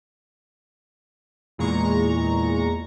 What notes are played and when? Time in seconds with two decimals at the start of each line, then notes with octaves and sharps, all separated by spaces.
1.58 E2 A#2 G#3 A#5 C#6